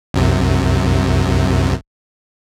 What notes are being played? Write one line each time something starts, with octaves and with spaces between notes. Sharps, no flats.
C2 F#2 C3